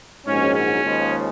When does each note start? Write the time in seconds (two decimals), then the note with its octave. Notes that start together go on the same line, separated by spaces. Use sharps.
0.25 A#1 G#2 F#3 C#4
0.54 C#4
0.84 D#2 C#3 F3 G#3